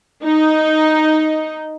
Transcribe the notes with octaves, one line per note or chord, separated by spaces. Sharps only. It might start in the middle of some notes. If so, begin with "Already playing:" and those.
D#4